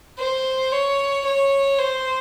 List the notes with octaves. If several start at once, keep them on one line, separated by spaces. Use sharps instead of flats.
C5
C#5
C#5
C5